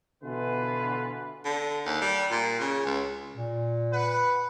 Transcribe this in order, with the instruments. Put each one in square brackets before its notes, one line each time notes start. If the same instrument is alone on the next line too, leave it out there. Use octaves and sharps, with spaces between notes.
[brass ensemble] B2 D3 E3 F4 B4
[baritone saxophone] D3
D#2
G3
A#2
C#3
C#2
[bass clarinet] A#2
[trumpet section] B4 F#5